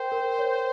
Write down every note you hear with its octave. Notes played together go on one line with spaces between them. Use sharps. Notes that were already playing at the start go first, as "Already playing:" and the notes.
Already playing: A#4 C5 G5
A#4
C#5